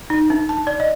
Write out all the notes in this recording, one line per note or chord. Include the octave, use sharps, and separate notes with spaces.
D#4
D4
A5
D5
D#5